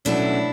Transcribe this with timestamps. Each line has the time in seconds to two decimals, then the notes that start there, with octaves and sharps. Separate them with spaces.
0.05 B2 F#3 A3 C#4 D4 E4